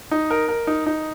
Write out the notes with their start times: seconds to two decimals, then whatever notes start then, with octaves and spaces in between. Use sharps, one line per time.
0.11 D#4
0.31 A#4
0.48 A#4
0.67 D#4
0.86 D#4